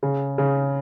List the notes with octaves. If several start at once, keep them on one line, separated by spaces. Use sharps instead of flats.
C#3
C#3